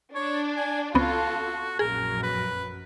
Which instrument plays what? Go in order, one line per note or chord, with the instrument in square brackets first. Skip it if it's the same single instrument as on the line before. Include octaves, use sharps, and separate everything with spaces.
[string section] D4 [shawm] C#5
[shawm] G#5
[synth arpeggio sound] C#2 B3 C4 [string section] F4 A4 [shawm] F#4
[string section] A#1 F#2 [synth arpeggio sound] G#4 [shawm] A#4
[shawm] B4